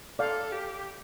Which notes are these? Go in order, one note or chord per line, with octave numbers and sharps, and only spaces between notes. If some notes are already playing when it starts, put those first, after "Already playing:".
A4 D5 F5
G4